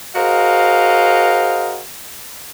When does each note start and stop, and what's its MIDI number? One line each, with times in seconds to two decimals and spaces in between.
0.15 1.82 66
0.15 1.82 68
0.15 1.82 70
0.15 1.82 72
0.15 1.82 75
0.15 1.82 77